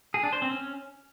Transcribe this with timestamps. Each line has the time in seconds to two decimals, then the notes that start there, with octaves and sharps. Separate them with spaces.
0.14 G#4
0.23 D4
0.33 C5
0.42 C4
0.51 C#4